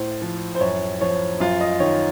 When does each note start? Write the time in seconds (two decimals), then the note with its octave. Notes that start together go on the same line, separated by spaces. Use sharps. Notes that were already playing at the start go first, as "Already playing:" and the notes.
Already playing: A2 C5
0.22 F3
0.55 C5
0.60 F#2 C#5
1.01 F3 C#5
1.40 F#2 F4
1.61 D#5
1.80 D#3 C#5